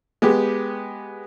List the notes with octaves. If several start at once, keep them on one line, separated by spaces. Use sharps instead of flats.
G#3 B3 G4